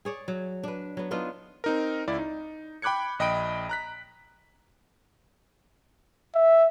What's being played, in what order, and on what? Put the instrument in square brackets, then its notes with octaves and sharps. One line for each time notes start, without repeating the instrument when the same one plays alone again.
[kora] G#4 C#5 D5
F#3
D4 B4
F#3 B3
B3 D4 D#4 F4
[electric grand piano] C4 D#4 A#4
C#2 E4 D5
D#4
G5 B5 D6 F#6 G#6 C#7
A#1 D#5 G5 B5 D7
A#5 F#6 B6
[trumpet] E5